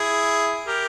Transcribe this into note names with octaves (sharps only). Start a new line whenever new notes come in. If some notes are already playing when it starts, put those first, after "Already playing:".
Already playing: E4 G#4
G4 A#4